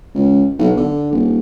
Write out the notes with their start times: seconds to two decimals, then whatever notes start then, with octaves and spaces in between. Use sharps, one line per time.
0.14 C#2
0.58 B1
0.77 D3
1.11 D#1